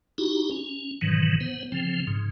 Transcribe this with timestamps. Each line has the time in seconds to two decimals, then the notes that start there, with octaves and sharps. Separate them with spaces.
0.18 D#4 E4 F#4 G4
0.51 C#4
1.01 G#2 B2 D#3 E3 F#3
1.41 B3 C5
1.72 C#3 F3 C4
2.07 G#2 C#3